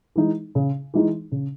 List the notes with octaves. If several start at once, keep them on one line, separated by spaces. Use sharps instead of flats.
E3 G#3 D#4
C#3
E3 G#3 D#4
C#3